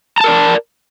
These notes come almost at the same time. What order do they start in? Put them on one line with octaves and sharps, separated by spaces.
A#5 A5 A#4 D5